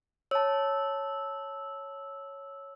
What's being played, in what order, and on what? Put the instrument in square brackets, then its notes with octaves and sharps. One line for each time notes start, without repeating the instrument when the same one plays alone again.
[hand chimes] C#5 A5 [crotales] E6